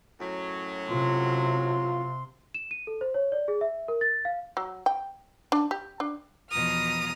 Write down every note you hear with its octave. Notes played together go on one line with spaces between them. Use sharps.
F#2 A2 F#3
C3 F4 C6
E7
D#7
A4
C5
C#5
D5
G#4
E5
A#4
A6
F5
F#3
G5
D4
G4
D4
E2 B2 F3 A#5 D#6 F6